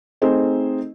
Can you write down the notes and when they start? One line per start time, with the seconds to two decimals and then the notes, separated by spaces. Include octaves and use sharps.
0.22 A3 C4 D#4 G#4 C5 D#5